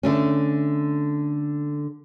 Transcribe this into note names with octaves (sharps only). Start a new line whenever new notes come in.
D3 A3 C#4